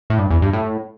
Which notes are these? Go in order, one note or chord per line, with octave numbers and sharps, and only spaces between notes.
A2
G2
E2
G2
A2